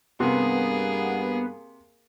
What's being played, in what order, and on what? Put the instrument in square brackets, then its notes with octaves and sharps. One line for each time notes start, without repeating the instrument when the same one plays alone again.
[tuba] G2 [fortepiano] C3 [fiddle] A#3 G#4 [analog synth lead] B3